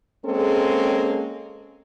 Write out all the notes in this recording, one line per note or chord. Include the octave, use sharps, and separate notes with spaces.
G#3 A#3 C4 C#4 G#4 A4